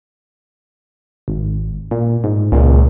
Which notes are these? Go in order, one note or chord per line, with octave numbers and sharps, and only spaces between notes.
G#1
A#2
G#2
C#2 A#2